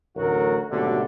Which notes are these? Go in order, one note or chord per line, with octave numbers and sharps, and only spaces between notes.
A1 D2 F#3 F#4 A4 A#4
G#1 B2 D3 F#3 A3 G4